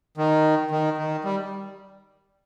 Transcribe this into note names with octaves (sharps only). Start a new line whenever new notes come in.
D#3
D#3
D#3
G3